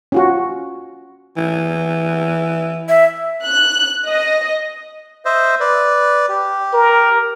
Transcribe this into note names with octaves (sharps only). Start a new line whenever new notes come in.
C#4 F4 F#4
E3
E5
F#6
D#5
C5 D#5 E5
B4 D5
G4
A#4